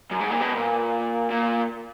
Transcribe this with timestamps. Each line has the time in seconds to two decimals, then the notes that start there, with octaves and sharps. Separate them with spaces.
0.12 F#2
0.21 G#2
0.31 A#2
0.41 B2
0.55 A#2
1.30 A#2